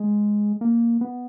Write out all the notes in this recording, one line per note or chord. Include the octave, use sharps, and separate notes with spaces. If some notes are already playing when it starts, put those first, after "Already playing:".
Already playing: G#3
A#3
B3